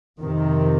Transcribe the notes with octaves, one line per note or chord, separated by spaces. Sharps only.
F2 C3 D#3